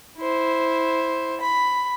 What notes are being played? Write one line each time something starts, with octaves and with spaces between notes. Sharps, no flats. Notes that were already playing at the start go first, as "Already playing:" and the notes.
E4 C5
B5